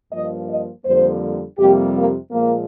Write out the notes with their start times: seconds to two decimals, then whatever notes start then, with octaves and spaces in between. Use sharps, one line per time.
0.12 G2 F3 A#3 D#5
0.47 D#5
0.84 F2 D3 G3 A#3 C5
1.58 F2 C3 G3 A#3 G4
1.95 A#3
2.30 A#2 F3 G#3 A#3